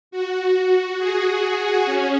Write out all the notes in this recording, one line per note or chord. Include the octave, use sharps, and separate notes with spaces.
F#4
G#4
C#4